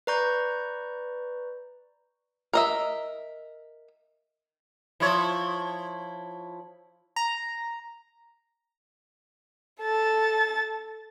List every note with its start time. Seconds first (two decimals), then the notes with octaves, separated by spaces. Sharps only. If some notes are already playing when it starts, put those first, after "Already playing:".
0.07 B4 D5 A#5 C#6 G6
2.53 A#4 D#5 E5
5.00 F3 E4 C#5
7.16 A#5
9.81 A4 A6